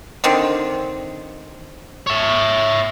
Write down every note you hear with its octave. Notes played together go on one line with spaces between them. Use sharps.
D3 D#3 C4
C#5 E5